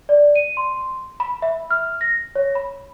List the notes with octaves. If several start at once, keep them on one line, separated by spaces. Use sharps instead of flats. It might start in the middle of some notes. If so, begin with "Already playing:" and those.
D5
D#7
C6
B5
E5
F6
A#6
C#5
B5